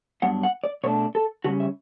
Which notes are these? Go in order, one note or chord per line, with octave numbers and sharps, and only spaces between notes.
G2 F#3 B3 D4 F#5
F#5
D5
B2 A3 D4 C#5
A4
C#3 G3 C#4 F#4
E5